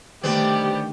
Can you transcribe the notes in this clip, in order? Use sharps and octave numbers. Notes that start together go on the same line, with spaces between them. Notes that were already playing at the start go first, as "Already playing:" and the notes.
G1 D#3 G3 A3 B3 C4 G4